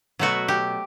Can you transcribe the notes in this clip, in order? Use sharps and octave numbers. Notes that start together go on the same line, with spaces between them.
B2 F#3 A3 F#4
G4